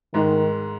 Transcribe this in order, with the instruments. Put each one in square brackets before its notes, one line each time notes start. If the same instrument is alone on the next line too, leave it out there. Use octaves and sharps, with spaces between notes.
[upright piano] G#2 G#3 [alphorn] D#3